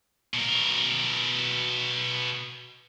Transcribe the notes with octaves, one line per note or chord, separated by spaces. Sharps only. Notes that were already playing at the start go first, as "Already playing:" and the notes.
B2 A#4